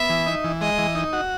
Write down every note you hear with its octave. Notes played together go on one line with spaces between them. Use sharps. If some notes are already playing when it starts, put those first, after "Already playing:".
Already playing: B3 E5
E3
D#4
E3
G#3 D#5
E3
D#4
F#4